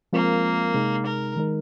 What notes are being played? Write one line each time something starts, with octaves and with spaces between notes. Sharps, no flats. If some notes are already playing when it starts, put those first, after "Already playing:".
F3 G#3 A#3 C4 F4 A#4
C3 G#3 D#4 G#4
A#4
D#3 G#3 D#4 A#4